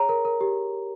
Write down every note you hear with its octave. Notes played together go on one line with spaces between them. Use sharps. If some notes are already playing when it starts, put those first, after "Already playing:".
Already playing: G#4 C#5 A#5
A#4
A#4
G4